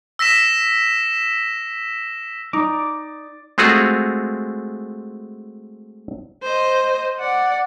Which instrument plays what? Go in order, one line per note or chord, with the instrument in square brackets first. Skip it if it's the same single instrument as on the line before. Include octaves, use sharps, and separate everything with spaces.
[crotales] E6 A#6 B6 E7
[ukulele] D#4 [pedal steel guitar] D5 D6
[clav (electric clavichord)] G#3 A3 C4 F4 F#4 G#4
[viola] C5 D#5
D5 F#5